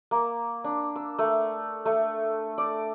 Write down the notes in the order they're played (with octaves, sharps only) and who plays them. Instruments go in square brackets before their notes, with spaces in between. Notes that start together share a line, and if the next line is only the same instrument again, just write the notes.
[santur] A#3
D4
E6
A3
A3
D5